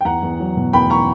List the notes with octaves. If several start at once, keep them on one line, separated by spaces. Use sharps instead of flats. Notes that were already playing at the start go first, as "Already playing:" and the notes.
G5
E2 F#5 A#5
E2
F#3
B2
E2 G5 B5
A#5 C#6